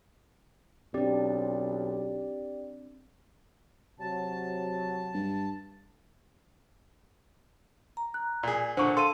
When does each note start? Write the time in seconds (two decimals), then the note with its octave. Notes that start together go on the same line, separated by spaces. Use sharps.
0.94 B1 C4 D4 G4 D5
4.00 C3 F#3 A5
5.14 G2
7.97 A#5
8.14 F#6
8.43 A#2 G#4 D5
8.77 A#2 D3 D4 C5 C#6
8.97 A4 F5 C6 D#7